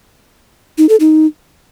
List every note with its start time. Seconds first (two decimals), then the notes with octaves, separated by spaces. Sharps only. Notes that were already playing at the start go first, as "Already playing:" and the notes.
0.78 D#4
0.89 A4
1.00 D#4